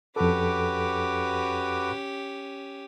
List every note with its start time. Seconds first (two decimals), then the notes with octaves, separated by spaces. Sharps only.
0.16 F2 C#4 F#4 G4 A4 B4 D6